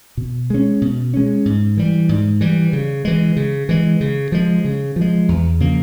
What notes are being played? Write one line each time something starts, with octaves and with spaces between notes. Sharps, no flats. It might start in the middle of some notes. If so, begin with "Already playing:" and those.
B2
G#3 C#4
B2
G#3 C#4
G#2
E3 G3
G#2
E3 G3
C#3
E3 G#3
C#3
E3 G#3
C#3
F3 G#3
C#3
F3 G#3
E2
C#3 F3 A#3